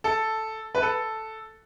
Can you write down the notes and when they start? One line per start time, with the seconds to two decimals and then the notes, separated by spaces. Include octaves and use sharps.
0.04 A4
0.75 B4
0.82 A4